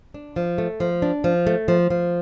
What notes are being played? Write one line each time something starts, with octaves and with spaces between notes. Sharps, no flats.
D4
F3
A3
F3
D4
F3
A3
F3
F3